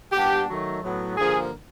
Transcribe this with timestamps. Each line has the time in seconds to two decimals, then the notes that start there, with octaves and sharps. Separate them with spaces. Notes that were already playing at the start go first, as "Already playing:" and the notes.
0.12 A#2 G3 B3 D4 G4
0.47 D#3 F#3 A3
0.81 A2 F#3 B3
1.16 G2 D3 F3 A#3 G#4